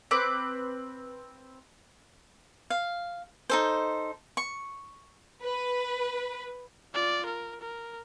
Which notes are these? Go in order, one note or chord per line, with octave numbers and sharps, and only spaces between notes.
C4 B4 D6
F5
D#4 A4 C5
C#6
B4
F4 D5
A#4
A#4